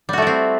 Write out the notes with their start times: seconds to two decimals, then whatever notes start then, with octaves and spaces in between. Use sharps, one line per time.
0.09 G3
0.13 F#4
0.18 A3
0.22 E4
0.27 C4